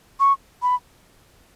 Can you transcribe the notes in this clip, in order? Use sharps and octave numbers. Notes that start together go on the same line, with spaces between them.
C#6
B5